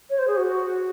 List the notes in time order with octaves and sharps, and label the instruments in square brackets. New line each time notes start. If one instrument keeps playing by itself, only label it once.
[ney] C#5
C5
G#4
F#4